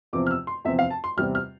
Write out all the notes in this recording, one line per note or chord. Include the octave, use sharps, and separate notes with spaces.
E2 C3 F3 C4 D6
F6
E6
C6
E2 C3 F3 C4 E5
F5
A5
C6
E2 C3 G3 C4 F6
F6